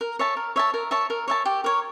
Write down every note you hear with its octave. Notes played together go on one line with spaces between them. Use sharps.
A#4
C#5 E5 A5
A#4
C#5 E5 A5
A#4
C#5 E5 A5
A#4
C#5 E5 A5
G4
A#4 C#5